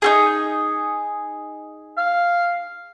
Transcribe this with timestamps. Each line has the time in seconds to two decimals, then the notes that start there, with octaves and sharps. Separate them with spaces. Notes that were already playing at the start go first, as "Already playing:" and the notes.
0.02 D#4 F4 G#4
1.98 F5